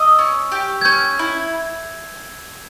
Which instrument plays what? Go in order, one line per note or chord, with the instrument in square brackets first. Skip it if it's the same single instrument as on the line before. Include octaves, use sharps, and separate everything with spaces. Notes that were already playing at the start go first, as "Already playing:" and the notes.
Already playing: [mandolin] D#5 [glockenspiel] E6
[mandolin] C#4
G4
[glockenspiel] G#6
[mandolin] C#4 [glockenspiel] G6
[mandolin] E4